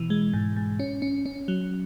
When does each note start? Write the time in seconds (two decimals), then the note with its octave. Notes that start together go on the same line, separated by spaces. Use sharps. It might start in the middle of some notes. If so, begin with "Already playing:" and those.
Already playing: B2 E3
0.10 G#3
0.34 G#2
0.57 G#2
0.79 C#4
1.02 C#4
1.26 C#4
1.48 F#3